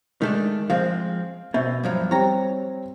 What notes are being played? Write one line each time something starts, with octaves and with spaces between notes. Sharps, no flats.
D#3 G#3 A3 D4
F3 G#3 C4 F5
B2 C4 E5
G2 F3 F#3
G3 C4 C#5 A#5